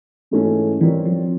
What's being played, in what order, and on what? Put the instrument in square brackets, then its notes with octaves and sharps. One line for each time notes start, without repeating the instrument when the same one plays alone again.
[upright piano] G#2 E3 A3 C#4
[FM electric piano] E3 [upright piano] G3 C4 F4 A#4 C#5
[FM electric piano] F3